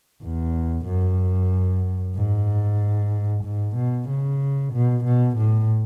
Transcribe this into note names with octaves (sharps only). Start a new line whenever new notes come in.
E2
F#2
G#2
G#2
B2
C#3
B2
B2
A2